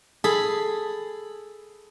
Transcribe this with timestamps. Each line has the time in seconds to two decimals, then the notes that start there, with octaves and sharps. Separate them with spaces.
0.24 G#4 A4 B5